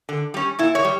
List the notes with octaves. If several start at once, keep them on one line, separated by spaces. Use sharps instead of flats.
D3
G3 C#4
A#2 E4
C#5
G3